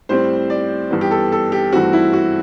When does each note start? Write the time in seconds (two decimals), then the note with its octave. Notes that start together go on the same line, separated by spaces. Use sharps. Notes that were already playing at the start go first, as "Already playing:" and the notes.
0.09 A2 G3 C4 C5
0.50 D5
0.91 G2 E3 B3
1.01 G4
1.11 A4
1.32 A4
1.52 G4
1.72 G2 E3 A3 C4 F#4
1.93 E4
2.13 F#4